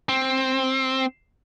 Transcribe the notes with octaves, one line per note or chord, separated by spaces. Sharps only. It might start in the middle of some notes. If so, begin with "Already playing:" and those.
C4